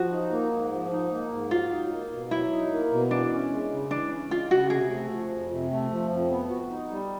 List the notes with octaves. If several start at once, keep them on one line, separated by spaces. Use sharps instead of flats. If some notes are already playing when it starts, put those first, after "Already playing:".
Already playing: F3 F#4
D#4
A#3
G#2
F3
D#4
A#3
G#2
F#3 F4
D#4
A#3
B2
F#3 E4
D#4
A#3
B2
E3 D4
C#4
G#3
C#3
E3 D4
C#4
G#3 F4
C#3 F#4
C3 G#4
A3
F3
F2
C3
A3
F3
F2
B3
F#4
D#4
G3